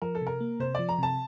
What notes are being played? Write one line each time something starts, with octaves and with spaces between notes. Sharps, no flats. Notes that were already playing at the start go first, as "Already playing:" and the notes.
F3 A#4
A4
C3
A#4
A#3
C3 C5
F3 D5
A#5
C3 A5